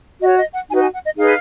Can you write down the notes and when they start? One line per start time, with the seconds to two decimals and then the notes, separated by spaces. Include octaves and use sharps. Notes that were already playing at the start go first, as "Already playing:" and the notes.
0.21 F#4 C#5 D#5
0.37 D#5
0.53 F#5
0.69 D#4 F#4 B4 G#5
0.81 G#5
0.93 F#5
1.05 D#5
1.16 D#4 G#4 B4 F5